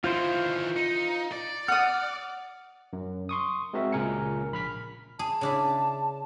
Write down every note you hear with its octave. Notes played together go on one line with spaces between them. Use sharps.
D#3 E3 F4 C5 C6
D#4
D5
F#5 D#6 F6
F#2
C6 C#6 D#6
G#3 C4 F#4 A#4 E5
C#2 A#2 C#3 A#4 G#5 C#7
A#1 B5 F6 B6
G#4 A5
C#3 D4 E4